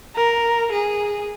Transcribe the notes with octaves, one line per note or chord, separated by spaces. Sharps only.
A#4
G#4